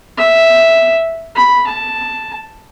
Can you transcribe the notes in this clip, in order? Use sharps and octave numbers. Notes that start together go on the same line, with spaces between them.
E5
B5
A5